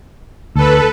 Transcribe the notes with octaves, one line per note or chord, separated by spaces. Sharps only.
D2 A4 B4